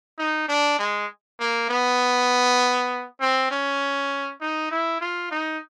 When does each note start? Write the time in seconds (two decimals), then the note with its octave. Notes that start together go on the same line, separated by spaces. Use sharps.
0.19 D#4
0.48 D4
0.79 G#3
1.40 A#3
1.70 B3
3.21 C4
3.51 C#4
4.41 D#4
4.71 E4
5.01 F4
5.31 D#4